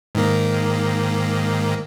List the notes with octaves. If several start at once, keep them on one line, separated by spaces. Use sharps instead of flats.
G#2 D#3 A#3